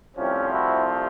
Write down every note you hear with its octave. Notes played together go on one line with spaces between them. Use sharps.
C2 C3 F3 A3 C4 C#4
E4 F#4